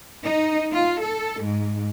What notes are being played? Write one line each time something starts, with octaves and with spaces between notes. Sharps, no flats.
D#4
F4
A4
G#2